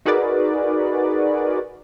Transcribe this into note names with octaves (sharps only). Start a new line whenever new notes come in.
D#4 F#4 G#4 A#4 B4 D5